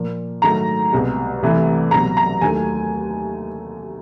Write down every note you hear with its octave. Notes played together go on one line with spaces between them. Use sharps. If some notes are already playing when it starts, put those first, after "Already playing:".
Already playing: A#2 F3 A#3
G#2 D#3 F#3 A3 A#5
C2 B2 G#3
C2 C3 E3 A3
C2 B2 F#3 A#5
A#5
D#2 D#3 F#3 A3 G#5